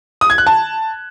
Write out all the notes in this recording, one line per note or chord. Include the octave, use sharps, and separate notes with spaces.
D#6
G#6
F#6
A5